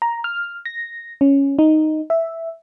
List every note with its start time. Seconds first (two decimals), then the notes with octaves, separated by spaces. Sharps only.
0.02 A#5
0.24 F6
0.66 A#6
1.21 C#4
1.59 D#4
2.10 E5